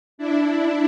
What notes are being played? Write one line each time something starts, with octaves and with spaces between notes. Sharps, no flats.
D4 E4